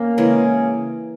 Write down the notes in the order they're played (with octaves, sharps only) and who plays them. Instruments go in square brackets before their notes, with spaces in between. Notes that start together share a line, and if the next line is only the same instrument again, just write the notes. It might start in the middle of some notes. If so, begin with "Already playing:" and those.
Already playing: [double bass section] A#3 [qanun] C#4
[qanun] C#3 E3 G#3